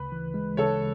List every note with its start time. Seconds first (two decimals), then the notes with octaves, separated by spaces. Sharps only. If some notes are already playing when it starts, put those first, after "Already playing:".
Already playing: D2 C#3 B4
0.12 E3
0.34 G#3
0.57 C#3 A4 C#5